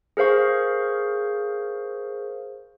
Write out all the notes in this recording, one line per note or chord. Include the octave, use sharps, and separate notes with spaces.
G#4 A#4 C5 F5 C#6